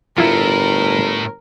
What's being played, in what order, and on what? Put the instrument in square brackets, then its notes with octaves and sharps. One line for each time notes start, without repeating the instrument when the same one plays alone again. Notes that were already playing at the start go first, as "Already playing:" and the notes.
[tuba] G1 [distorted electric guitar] A2 [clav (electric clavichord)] E4 F4 [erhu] A#4